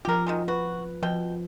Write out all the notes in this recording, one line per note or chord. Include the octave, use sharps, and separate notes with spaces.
F3 F4 G4 A#4
D#3 F#3 G#3
F#4 B4
B2 F3 G5